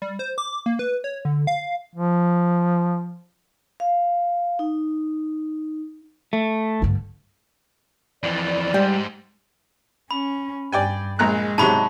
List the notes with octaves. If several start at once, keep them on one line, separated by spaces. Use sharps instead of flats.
G3
C5
D6
A#3
B4
C#5
D3
F5
F3
F5
D#4
A3
G2 D3
F2 E3 D5
G#2 G3
C#4 B5
G2 D5 G5 G#5
A#1 G#3 A#5 F#6
G#2 C3 F#3 A5 B5 C#6